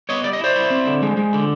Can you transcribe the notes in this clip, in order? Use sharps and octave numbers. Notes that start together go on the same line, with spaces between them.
B3 C#5 D#5
G3 D5
D#5
E4 C5 D5
E4
C4
D3
G#3
G#3
D3